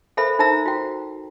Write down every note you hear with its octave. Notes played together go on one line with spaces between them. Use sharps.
A4 A#4 C5 E5 B5
D#4 A#4 C5 E5 A#5 E6
F#4 G5